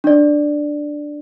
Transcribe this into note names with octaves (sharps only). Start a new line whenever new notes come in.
D4 D5